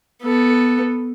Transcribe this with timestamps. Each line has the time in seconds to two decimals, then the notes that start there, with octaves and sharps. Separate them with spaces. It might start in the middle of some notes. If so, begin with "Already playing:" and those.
0.23 B3 A4